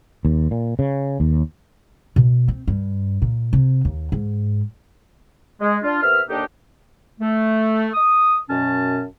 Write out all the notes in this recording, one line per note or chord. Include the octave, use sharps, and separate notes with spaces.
D#2
A#2
C#3
D#2
B2
C4
G2
A#2
C3
D#2
G#2
G#3
D4 F4
C3 B3 A#4 E5 F6
D#2 D3 A#3 D4 D#4 G4
A3
D#6
F#2 B2 C#4 A5